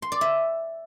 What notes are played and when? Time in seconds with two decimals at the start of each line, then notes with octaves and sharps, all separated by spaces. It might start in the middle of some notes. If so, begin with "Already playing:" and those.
0.02 C6
0.12 D5
0.21 E5